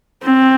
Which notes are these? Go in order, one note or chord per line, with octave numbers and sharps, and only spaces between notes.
C4